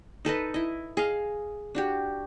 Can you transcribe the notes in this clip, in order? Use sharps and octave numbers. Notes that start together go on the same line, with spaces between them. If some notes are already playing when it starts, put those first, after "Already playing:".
D#4 A4 B4 D#5
E4 D#5
G#4 D#5 F5
D4 F#4 G4